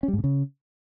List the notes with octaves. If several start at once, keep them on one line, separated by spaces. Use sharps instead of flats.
C#4
G3
G#2
C3
C#3